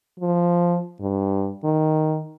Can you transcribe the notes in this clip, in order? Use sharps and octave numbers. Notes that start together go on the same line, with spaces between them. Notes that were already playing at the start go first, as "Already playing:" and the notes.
F3
G2
D#3